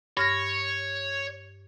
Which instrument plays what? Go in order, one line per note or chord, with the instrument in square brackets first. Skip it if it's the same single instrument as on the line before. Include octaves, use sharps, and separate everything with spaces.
[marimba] G2 F6 A#6 [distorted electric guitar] C#5